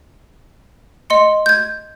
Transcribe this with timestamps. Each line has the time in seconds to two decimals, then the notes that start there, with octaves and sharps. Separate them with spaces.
1.10 D#5 C6 C#7
1.46 G6 G#6